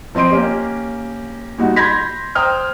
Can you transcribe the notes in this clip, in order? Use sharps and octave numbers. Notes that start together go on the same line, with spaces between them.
F3 C4 D#5 C6 D7
A#3 C#4 G4
A#2 G3 D#4 F#4
B5 C6 G6 G#6 A#6 B6
C5 G5 A#5 D#6 F6